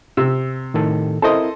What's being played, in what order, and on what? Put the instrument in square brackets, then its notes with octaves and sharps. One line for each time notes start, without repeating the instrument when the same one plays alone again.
[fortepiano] C3 [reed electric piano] E6
[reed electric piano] A2 D#3 A4
[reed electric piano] C4 E4 A#4 [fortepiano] A4 C5 D#5